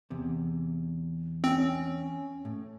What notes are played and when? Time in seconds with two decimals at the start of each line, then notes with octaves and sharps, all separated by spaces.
0.10 E2 C3
1.44 C4 C#4
2.45 A2